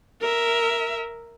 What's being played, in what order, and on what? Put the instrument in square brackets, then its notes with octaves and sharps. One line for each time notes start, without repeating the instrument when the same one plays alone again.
[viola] A#4 E5